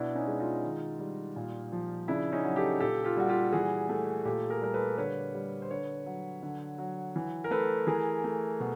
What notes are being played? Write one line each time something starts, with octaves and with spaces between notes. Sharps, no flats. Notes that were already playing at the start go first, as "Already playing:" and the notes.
Already playing: B2 D4 E4
C#4 D#4
G#3
D#4 F4
D#3
G3
A#2
F3
C#3 D4 E4
C#4 D#4
F#3
G4 A4
A#2 G4 A4
F4 G4
G3 F#4
F4 G4
E3 F#4 G#4
A3
A#2 G4 A4
G#4 A#4
G3 A#4
A4 B4
D3 B4 C#5
G3
C5
D3 B4 C#5
F#3
D3
F#3
E3
A#4
A3 A4 B4
E3 G#4 A#4
A3
B2